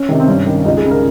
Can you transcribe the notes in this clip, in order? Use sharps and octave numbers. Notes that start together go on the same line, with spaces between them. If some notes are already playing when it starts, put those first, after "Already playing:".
Already playing: C#4
C3 D#3
C4
G2 C#4
D#3
C#2 D#4
G#4
C#3
A#4